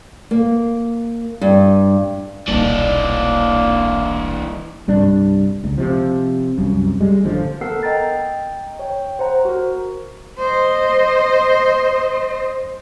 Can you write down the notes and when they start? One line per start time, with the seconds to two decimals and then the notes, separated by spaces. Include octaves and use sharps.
0.31 A#3
1.41 G2
2.48 D#1 B1 E3 A#3 D4
4.88 C2 G2 D4
5.64 C#2
5.78 C3 F3
6.58 C2 F#2
7.00 G3 G#3
7.24 A1 D3 F3
7.61 B3 A4 A#4 F#5 E6 C7
7.83 D#5 G5 A#5 A6
8.79 C#5 G5
9.19 C5 F#5 A#5
9.45 F#4 A#4
10.38 C5 D#5